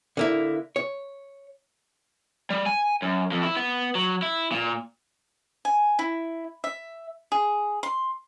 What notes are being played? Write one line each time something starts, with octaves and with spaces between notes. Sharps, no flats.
D3 A#3 E4
C#5
G3
G#5
F#2
F2
E4
B3
F#3
E4
A#2
G#5
E4
E5
G#4
C6